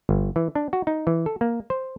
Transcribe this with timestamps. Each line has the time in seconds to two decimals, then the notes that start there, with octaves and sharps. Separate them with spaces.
0.09 G1
0.36 E3
0.55 D4
0.73 F#4
0.87 D#4
1.07 E3
1.26 A4
1.41 A#3
1.70 C5